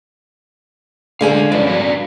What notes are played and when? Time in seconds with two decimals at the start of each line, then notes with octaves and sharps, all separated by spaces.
1.21 D3 G#3 G#4 F5 G#5
1.52 G2 F3 C#4 D5
1.67 F#4 D5 F5